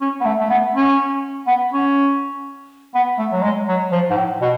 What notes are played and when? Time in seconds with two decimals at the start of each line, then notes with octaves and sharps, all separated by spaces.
0.01 C#4
0.21 B3
0.25 A3
0.40 A3
0.50 B3
0.74 C#4
1.47 B3
1.72 C#4
2.95 B3
3.19 A3
3.32 F#3
3.42 G#3
3.68 F#3
3.92 F3
4.10 G#2
4.16 A2
4.41 B2